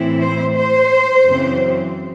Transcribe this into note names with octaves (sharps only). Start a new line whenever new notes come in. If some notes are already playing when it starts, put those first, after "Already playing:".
Already playing: A2 E3 C4 E4
C5
C5
F#2 C#3 E3 C4